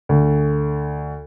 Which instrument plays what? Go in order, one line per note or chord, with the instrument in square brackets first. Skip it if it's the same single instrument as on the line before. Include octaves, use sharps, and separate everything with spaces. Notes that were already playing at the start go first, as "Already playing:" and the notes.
[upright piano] D2